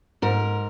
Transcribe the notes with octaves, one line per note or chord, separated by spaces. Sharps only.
G#2 A#4